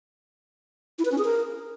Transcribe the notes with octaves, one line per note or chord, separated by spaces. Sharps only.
E4
B4
C#4
G#4
A#4